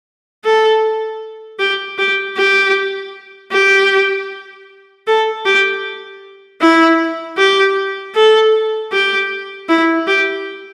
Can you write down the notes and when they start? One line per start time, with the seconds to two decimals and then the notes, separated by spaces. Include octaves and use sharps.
0.45 A4
1.59 G4
1.98 G4
2.37 G4
3.52 G4
5.07 A4
5.45 G4
6.62 E4
7.38 G4
8.15 A4
8.92 G4
9.69 E4
10.07 G4